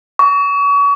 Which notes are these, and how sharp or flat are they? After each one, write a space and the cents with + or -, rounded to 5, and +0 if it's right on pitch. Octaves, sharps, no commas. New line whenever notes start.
C#6 +35